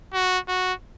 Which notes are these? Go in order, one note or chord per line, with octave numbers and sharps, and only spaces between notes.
F#4
F#4